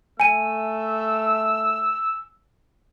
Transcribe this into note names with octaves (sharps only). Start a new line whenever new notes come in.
A3 G#5 E6 D#7